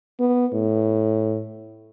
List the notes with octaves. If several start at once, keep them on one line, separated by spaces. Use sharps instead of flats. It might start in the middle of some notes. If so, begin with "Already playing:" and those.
B3
A2